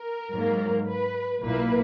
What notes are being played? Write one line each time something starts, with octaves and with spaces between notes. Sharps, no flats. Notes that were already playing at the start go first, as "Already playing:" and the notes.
Already playing: A#4
G#2 F#3 A#3
B4
B1 A#2 A#3 E4 B4